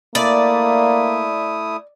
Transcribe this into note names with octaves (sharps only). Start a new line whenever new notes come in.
A3 A#3 E4 D5 D#6